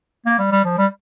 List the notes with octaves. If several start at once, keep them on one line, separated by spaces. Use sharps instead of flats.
A#3
G3
G3
F3
G3